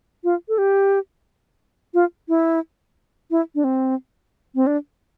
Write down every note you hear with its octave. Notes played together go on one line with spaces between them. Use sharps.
F4
A4
G4
F4
E4
E4
D4
C4
C4
D4